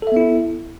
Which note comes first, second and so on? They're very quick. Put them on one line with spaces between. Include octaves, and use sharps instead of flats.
A4 E5 B3 E4